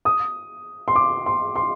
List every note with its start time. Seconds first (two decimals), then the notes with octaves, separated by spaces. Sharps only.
0.05 D#6
0.88 C6
0.96 D6
1.26 C6
1.56 C6